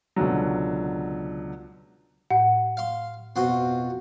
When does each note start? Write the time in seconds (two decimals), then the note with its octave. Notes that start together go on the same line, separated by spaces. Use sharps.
0.16 C#2 B2 D3 F#3
2.31 A2 F#5
2.77 F5 C6
3.36 F2 B2 F#4 C6